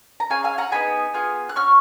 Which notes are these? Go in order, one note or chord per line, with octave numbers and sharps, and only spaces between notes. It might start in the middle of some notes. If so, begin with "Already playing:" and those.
A#5
C#4 G#4 F5 G#5
F5 G#5
F#5 A#5
B3 D#4 G#4 G#5 B5
B3 F4 G#4
F#6
C#4 F#4 C#6 F6